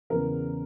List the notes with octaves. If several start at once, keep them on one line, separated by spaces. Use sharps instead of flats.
E2 C#3 E3 A#4